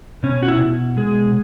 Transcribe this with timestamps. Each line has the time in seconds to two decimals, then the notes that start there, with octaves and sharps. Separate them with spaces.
0.23 B2 C#4
0.43 F#4
0.48 E4
0.60 B2
0.97 G#3 G#4